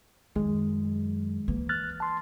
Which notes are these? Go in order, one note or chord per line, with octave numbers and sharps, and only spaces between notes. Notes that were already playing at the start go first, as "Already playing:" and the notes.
F#2 D#3 G#3
E3 A#3
F6 F#6 A6
A5 C6